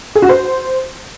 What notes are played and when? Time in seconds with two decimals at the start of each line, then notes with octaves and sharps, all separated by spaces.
0.15 G#4
0.22 F#4
0.29 C5